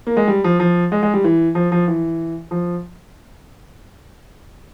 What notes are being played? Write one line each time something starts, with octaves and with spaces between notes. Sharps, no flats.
A#3
G#3
G3
F3
F3
G#3
G#3
G3
E3
F3
F3
E3
F3